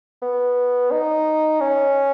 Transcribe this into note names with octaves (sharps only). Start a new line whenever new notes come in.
B3
D#4
C#4